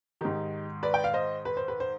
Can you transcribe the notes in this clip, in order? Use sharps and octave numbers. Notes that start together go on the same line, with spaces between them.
G#2 D#3 D#4 G4
B4 D5
G5
F5
C5 D#5
B4
C5
B4
C5